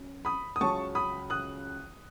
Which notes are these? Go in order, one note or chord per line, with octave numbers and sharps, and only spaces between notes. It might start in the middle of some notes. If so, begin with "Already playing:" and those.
Already playing: F#2
B5 D#6
D#6
C#2 C#3 F#3 A5 C#6
B5 D#6
D#6 F#6